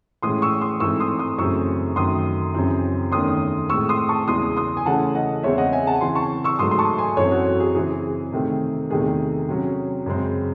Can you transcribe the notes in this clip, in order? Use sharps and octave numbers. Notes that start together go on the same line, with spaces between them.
A2 E3 G#3 C#4 C6 D#6
C#6 E6
C6 D#6
G#2 E3 A3 C4 C#6 E6
C6 D#6
C6 D#6
F#2 C#3 E3 A3 C4 C#6 E6
F#2 D#3 A3 C6 D#6
F#2 C#3 E3 C4
E2 D#3 A3 C#4 C6 D#6
A2 G#3 C4 C#6 E6
C6 D#6
A5 C#6
E2 C#3 E3 G#3 C6 D#6
C6 D#6
G#5
C#3 E3 A3 C#4 F#5 A5
D#5 F#5
E2 C#3 G#3 C4 C#5 E5
D#5 F#5
E5 G#5
F#5 A5
C#3 E3 C4 G#5 C6
A5 C#6
C#6 E6
G#2 F#3 A3 C6 D#6
C6
A5 C#6
G#5 C6
F#2 E3 C4 A4 C#5
F#4 A4
F#4
G#4
C#3 E3 C4 G#4
C3 D#3 A3 C4
E2 C3 D#3 A3 G#4
C3 F#3 C#4
F#2 C#3 G#3 C4